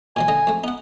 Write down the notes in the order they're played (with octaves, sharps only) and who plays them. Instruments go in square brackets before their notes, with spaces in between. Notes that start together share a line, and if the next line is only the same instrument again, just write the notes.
[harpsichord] A#2 D#3 F3 [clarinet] G#5
[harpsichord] D3 D#5
F2 A3
[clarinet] B3 [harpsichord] D#4 F#5